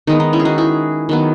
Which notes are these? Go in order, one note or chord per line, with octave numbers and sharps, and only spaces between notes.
D#3 G#3 B3 D#4
D#4
C#4 E4
G#4
D#4 F#4
E4 G#4
D#3 F#3 B3